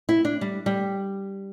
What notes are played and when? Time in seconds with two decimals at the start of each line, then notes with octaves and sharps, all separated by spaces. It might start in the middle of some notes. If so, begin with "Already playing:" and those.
0.09 E4
0.25 D4
0.41 G3
0.66 G3